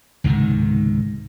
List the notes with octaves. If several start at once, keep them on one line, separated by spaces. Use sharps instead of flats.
C#2 G#2 C3 D#3